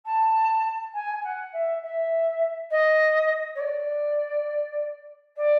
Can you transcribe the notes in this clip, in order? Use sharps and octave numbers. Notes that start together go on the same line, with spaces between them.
A5
G#5
F#5
E5
E5
D#5
C#5
D5
D5